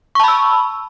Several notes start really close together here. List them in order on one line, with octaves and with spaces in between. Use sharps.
C#6 A5 B5 E6